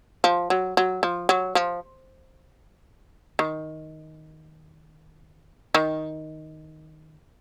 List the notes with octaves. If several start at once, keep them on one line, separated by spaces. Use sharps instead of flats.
F3
F#3
F#3
F3
F#3
F3
D#3
D#3